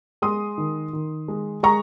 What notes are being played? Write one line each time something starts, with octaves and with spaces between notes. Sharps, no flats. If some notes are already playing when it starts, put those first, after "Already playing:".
G#3 C6 D#6
D#3
D#3
G#3
G#3 A#5 C#6